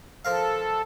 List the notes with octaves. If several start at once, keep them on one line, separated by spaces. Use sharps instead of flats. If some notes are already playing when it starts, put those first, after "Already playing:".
F3 A4 A#4 F5